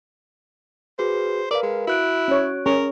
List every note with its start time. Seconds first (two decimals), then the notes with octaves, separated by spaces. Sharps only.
0.99 F#4 G#4 B4 C5
1.51 A#4 B4 D5 F5
1.63 G#3
1.87 E4 F#4 F#6 D7
2.28 C#4 C#5
2.66 C#4 G#4 A#4 C#6